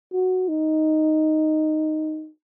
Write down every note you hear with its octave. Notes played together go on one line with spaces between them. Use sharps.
F#4
D#4